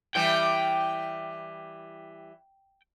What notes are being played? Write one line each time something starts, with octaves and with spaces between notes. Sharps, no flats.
E3 G3 G5